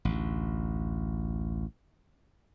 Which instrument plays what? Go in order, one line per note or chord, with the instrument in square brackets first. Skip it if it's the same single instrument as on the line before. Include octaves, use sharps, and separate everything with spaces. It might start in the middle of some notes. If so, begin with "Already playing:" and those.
[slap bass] A1 D2